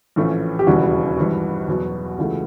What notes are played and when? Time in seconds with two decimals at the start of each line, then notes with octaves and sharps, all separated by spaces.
0.16 A#1 A2 E3 A3 C#4
0.59 G4
0.67 E1 D#2 C#3 E3 G3 F#4
1.17 G#1 G2 E3
1.68 E2 B2 F#3 B3
2.18 C#2 C#3 E3 A3